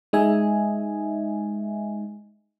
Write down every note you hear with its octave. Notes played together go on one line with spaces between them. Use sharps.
G#3 D#4 D#5 E5 G#5